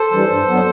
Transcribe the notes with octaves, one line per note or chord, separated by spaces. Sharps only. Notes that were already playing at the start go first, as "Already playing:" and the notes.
Already playing: A4 C5
E3 G3 D4
G2
F#3 B3 D4